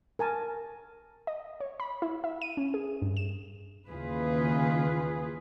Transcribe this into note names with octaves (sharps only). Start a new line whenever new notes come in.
A#4 G#5 A5
D#5
C#5
B5
E4
E5
D#7
C#4
G#4
G2
E7
D#2 C#3 E3 F4 G#4 B4